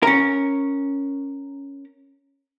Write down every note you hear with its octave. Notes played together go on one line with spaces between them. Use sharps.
C#4 A#4